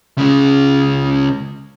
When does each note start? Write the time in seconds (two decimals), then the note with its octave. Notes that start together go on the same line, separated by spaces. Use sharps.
0.18 C#3 G#3